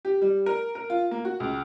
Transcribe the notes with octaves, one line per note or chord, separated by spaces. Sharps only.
G4
G3
A#4
A#4
F4
A#3
F#4
C#2